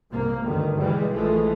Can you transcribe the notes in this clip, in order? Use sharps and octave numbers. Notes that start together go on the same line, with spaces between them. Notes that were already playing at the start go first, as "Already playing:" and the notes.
C2 G#2 A#3
D2 G2 D#3
B2 E3 G3 G#3
A#1 E3 F3 G#3 A3